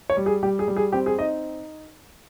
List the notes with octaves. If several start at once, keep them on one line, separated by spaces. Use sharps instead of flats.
C#5
G3
G#4
G3 G4
G#4
G3
G#4
C4 G4
G#4
D#4 D#5